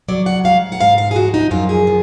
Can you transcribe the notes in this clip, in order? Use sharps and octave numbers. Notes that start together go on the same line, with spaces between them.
F#3 D5
F#5
G#2 F5
F#5
G#2 F5
F5
G#4
F3 F#4
D#4
F#2 F4
G#4
F3